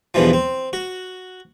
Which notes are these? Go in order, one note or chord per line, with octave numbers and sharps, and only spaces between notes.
E2 G2 B2 E3 F3
C4
F#4